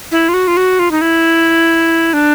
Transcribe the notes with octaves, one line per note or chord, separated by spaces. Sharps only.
E4
F4
F#4
F4
F#4
F4
D#4
E4
D4